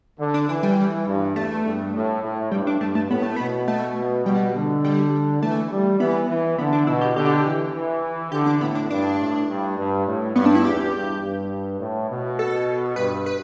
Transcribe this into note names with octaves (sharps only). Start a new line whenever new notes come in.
D3
D4
E3 D4
G3
E3
G2
E2 A3
G2
A2
A2
G2 G3
D4
G2 A3
A3
A2 B3
A3
B2 B3
A3
B2 G3
D3
G3
E3 A3
G3
E3 B3
E3
D3 B3
D4
B2 E4
G4
D3 G4
E3
E3
D3 G4
D4
A2 B3
D4
G2 D4
A2
G2
G2
A2
G2 B3
D4
E4
E2 G4
G2
G2
A2
B2
A4
G2 B4
B4